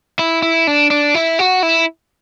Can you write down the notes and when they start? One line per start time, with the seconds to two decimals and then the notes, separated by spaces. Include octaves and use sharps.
0.19 E4
0.42 E4
0.67 D4
0.91 D4
1.15 E4
1.39 F#4
1.63 E4